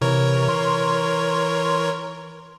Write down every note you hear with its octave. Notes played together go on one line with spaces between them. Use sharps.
C3 E3 A#4 C#5
C6